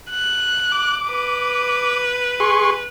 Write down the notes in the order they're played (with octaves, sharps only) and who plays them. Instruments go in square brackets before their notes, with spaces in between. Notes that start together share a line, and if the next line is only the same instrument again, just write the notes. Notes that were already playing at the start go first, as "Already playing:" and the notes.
[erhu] F#6
[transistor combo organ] D6
[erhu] B4
[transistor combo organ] G#4 C6 C#6